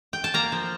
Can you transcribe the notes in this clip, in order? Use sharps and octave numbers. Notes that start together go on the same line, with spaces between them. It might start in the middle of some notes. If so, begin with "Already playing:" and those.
G5
A5
A#3 A#5
F3